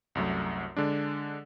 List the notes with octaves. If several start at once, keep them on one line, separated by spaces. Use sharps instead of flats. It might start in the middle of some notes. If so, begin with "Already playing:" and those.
C2 F#2 F#3 A3
D3 G#3 D4